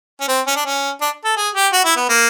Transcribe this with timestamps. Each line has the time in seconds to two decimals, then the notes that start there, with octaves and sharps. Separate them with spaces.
0.21 C#4
0.28 C4
0.47 C#4
0.56 D4
0.65 C#4
1.01 D4
1.24 A4
1.37 G#4
1.55 G4
1.73 F#4
1.85 E4
1.96 B3
2.09 A#3